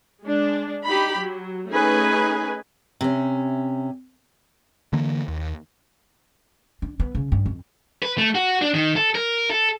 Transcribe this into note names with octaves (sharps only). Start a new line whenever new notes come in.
G#3 D4
D#4 G4 B5
F#3
A3 C#4 D#4 G#4 B4 G#5
C3 C#4
D3 E3 A#3
D#2
D4
B3
C#3
G2
F2
B4
A3
F#4
D4
D#3
A4
A#4
A4